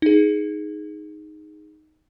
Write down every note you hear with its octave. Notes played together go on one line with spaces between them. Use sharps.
D#4 G#4